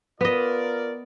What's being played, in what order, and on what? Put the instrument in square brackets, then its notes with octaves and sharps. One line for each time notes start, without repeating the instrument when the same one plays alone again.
[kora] B3 D#5 [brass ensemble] F4 A#4 D5